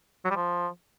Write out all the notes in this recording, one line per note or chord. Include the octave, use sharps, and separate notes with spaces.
F#3
G3
F3